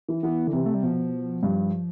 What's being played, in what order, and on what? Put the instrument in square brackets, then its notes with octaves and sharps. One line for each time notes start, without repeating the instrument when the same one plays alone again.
[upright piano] E3
[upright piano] E3 [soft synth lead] B3
[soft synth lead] D3
[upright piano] C3 [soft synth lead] E3
[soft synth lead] A3
G3
[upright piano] B2 [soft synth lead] F3
[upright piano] G2